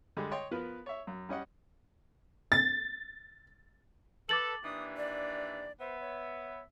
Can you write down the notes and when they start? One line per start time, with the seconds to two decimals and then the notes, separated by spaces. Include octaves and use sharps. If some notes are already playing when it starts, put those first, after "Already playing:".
0.17 D3 G3 G#3
0.31 C#5 D#5 G5 C6 C#6
0.51 F3 B3 A#4 B4
0.86 C#5 E5
1.07 F#2
1.29 G3 C#4 D#5 F#5
2.52 A6
4.29 A4 B4 D6 A6 F#7
4.63 D#2 E3 D4 D#6
4.97 D5
5.80 B3 C5 E5
6.00 C#5